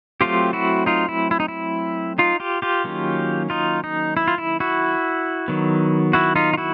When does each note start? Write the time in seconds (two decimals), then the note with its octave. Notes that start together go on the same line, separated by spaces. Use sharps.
0.21 F#3 A3 C4 F4 G4
0.53 E4 F#4
0.86 D#4 F4
1.09 E4
1.31 E4
1.40 D#4
1.48 E4
2.18 D#4 F4
2.40 F4 G4
2.62 F4 G4
2.84 D#3 F#3 A#3 C#4
3.50 D#4 F4
3.84 D#4
4.17 E4
4.28 F4
4.38 E4
4.60 E4 F#4
5.48 D#3 F#3 B3
6.13 E4 F#4
6.36 D#4 F4
6.53 F4
6.57 E4 F#4